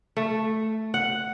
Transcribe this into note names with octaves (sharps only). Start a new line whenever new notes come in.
A3
F#5